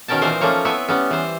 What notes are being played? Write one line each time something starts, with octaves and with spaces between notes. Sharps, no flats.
B2 D#3 C#4 A#4 G5 A5
A#2 E3 D#4 C5 G#5
F3 A3 A#3 C#4 C#5 A#5
B3 C4 E4 C#5 E5 G#5
G3 B3 C#4
E3 C5